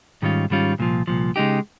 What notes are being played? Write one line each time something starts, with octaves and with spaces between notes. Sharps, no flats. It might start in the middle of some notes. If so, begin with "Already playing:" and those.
G#2 D#3 G3 C#4 F4
G#2 D#3 G3 C#4 F4
C2 A#2 F3
C2 A#2 F3
C#3 G#3 D#4 G4